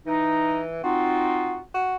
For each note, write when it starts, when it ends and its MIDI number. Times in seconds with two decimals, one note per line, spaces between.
0.07 0.82 52
0.07 0.61 63
0.84 1.58 60
0.84 1.58 63
0.84 1.58 65
0.84 1.61 66
1.75 1.96 66